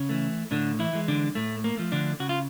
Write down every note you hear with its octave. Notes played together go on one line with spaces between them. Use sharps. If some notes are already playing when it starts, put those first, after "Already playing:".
Already playing: C#3 C#4
E3 A3
A2 D3 D4
E3 E4
E3 G#3
D3 D4
A2 A3
A#3
F3 A3
D3 D4
C#3 F#4
F4